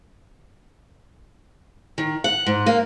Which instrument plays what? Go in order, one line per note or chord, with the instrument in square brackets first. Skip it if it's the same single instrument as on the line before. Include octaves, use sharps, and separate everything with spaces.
[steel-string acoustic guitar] D#3
F#5
G#2
A#3